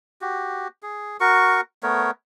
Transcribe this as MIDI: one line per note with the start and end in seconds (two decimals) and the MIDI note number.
0.21 0.68 66
0.21 0.68 67
0.83 1.17 68
1.20 1.61 66
1.20 1.61 70
1.20 1.61 85
1.83 2.11 57
1.83 2.11 59
1.83 2.11 70
1.83 2.11 73